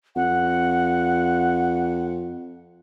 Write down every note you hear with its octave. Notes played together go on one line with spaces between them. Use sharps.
F2 F#5